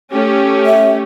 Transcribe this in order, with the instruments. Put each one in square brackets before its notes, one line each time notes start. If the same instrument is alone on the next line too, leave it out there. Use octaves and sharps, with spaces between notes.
[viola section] A3 C#4 G4
[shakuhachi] E5